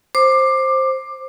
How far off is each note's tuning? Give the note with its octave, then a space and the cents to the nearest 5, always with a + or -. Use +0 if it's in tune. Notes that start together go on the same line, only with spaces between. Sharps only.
C5 +10 D6 +15